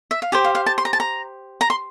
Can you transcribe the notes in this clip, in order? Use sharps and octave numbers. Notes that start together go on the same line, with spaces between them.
E5
F5
G4 C5 G5
F5
F5
A5
C6
A#5
A5
A#5
A#5
C6